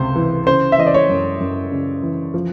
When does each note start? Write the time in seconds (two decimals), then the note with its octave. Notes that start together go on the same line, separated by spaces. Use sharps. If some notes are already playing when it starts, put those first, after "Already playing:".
Already playing: C#2 C3 C5
0.15 E3
0.47 C#3 C5
0.72 E5
0.78 E3 D#5
0.87 D5
0.94 C#5
1.09 F#2
1.40 F#2
1.72 C#3
2.03 E3
2.34 F3